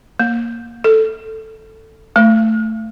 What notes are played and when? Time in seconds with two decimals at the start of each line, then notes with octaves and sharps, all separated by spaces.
0.19 A#3
0.84 A4
2.16 A3